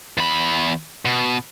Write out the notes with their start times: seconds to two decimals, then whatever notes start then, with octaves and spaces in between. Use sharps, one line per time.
0.18 E2 B5
1.05 B2